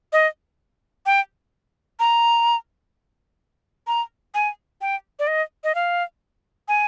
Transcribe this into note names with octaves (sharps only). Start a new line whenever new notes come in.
D#5
G5
A#5
A#5
G#5
G5
D5
D#5
D#5
F5
G#5